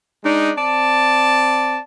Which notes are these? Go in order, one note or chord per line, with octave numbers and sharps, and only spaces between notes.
G#3 D4 D#4
C4 D5 A5